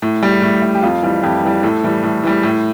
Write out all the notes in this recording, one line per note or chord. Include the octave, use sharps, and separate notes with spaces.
A2
G3
A2
G3
G4
F2 F4
E3 G3
F2 G4
E3 G3
A2 A4
E3 G3
A2
E3 G3
A2